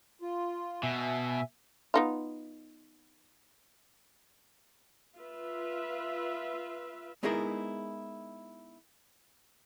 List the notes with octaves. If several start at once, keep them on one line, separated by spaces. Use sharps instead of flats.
F4
B2 E5 G#5
B3 D#4 F4
F4 B4 E5
G#3 B3 D#4 E4 G#4 A#4